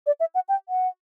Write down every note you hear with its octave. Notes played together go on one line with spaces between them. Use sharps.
D5
E5
F#5
G5
F#5